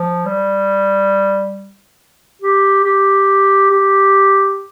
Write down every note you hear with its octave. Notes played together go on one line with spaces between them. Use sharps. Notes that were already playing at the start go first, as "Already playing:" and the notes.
Already playing: F3
G3
G4
G4
G4